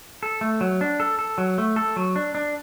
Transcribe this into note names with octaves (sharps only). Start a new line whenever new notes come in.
A4
A3
F#3
D4
A4
A4
F#3
A3
A4
F#3
D4
D4